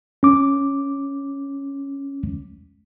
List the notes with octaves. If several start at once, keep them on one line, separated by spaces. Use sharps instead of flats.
C#4 D6